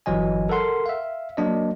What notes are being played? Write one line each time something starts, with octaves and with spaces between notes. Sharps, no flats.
G1 E3 F#3 D#5 G#5
A4 A#4 F#5 C6
E5 F5
F#3 A#3 D4 D#5